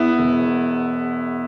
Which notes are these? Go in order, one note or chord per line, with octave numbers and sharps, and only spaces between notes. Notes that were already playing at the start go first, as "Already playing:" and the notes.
Already playing: E2 B3 E4
E1